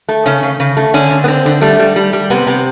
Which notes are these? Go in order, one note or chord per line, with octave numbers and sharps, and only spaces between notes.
A3
C#3 C#4
C#3
C#3
A3
D3 C#4
D3
B3
D3 C4
D3
G3 A3
G3
G3
G3
C3 B3
C3